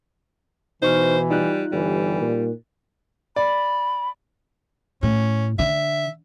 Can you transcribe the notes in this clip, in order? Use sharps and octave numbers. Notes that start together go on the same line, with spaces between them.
B2 E3 D#4 C5 C#6 F6
G3 D#4 F4 F#6
G1 E3 G3
A#2
D5 B5
A2 C#4
D3 E5